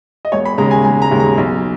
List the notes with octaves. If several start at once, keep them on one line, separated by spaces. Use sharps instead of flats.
D#5
E1 C#5
B5
D#2 C#3 G#3 A#5
G#5
E1 G#5
A#5
D#2 C#3 G#3
A#5
B1